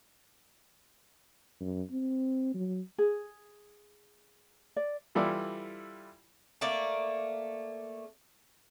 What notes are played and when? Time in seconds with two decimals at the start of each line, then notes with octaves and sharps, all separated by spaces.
1.60 F#2
1.91 C4
2.55 F#3
2.98 G#4
4.76 D5
5.15 E3 G3 E4 F4 A4 D5
6.61 A3 A#3 D5